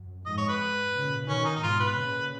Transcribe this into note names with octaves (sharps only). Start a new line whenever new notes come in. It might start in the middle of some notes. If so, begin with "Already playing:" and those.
Already playing: F#2
F2 G#2 D#5
C#5
B4
A#2 C#3
B2 D#3 C#4
D#4
D#4
G#2 B2 F4
B4
A#2 C#3